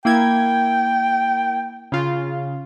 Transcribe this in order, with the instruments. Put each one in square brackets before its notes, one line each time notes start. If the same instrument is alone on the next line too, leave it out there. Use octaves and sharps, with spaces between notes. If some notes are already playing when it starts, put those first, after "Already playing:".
[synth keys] A#3 E4 G#6 [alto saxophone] G5
[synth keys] C#3 F4